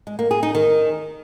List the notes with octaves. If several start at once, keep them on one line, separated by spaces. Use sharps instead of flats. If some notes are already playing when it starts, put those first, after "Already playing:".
G#3
A#3
G#4
D#4
D#3